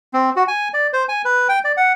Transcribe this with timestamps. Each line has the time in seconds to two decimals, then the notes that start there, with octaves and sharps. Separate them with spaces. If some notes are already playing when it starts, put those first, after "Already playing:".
0.14 C4
0.36 F#4
0.48 G#5
0.74 D5
0.93 C5
1.09 G#5
1.25 B4
1.49 G5
1.64 D5
1.77 F#5